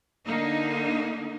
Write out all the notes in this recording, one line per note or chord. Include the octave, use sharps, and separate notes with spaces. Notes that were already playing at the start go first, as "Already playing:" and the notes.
D3 A#3 D#4